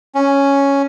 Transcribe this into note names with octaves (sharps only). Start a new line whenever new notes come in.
C#4